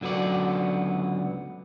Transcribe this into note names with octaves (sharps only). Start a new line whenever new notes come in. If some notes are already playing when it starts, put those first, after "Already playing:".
C#2 D3 F#3 B3 D5